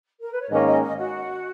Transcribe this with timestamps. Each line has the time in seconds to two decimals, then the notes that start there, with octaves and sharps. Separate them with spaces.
0.22 A#4
0.32 B4
0.41 C#5
0.50 G#2 D#3 A#3 C#4 D#5
0.66 D#5
0.82 D#5
0.97 F#4